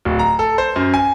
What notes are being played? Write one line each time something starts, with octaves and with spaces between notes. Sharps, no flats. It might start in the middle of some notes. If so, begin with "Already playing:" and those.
D1
A#5
A4
C5
F#2
G#5